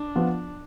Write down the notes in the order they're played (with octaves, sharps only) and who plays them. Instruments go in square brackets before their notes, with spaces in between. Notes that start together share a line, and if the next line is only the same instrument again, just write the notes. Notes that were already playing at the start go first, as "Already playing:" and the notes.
Already playing: [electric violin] D4
[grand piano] F3 B3 F4